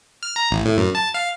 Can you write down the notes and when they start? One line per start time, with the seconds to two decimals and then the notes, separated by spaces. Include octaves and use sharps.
0.23 F6
0.36 A#5
0.51 A1
0.66 A2
0.77 F#2
0.95 A5
1.14 F5